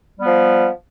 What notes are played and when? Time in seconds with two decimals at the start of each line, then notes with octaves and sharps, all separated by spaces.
0.19 G3
0.22 B3
0.25 F3